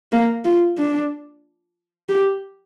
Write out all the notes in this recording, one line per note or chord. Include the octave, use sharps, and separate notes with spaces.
A#3
F4
D4
G4